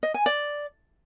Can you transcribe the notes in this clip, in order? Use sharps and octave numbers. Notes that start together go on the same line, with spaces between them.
D#5
G#5
D5